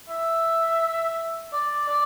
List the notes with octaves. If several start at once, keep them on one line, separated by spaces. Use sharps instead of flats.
E5
D5
D5